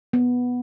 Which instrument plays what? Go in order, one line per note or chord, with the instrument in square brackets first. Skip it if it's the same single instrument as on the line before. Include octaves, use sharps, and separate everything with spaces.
[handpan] B3